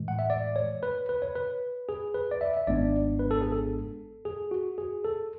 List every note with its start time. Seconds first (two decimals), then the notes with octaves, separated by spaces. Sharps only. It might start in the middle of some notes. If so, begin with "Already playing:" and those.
Already playing: A2 E3 G#3
0.08 F#5
0.19 E5
0.30 D5
0.56 C#5
0.83 B4
1.09 B4
1.22 C#5
1.35 B4
1.89 G#4
2.14 B4
2.31 D5
2.41 E5
2.57 E5
2.67 G#1 G#2 G#3 B3 D4 D5
3.19 B4
3.31 A4
3.42 G#4
3.52 A4
4.25 G#4
4.51 F#4
4.78 G#4
5.04 A4